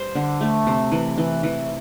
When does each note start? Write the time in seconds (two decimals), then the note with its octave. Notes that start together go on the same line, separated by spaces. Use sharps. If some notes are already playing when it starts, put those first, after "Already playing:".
Already playing: G3 C5
0.15 D3
0.41 A3
0.67 C3
0.92 E3
1.18 E3
1.43 E3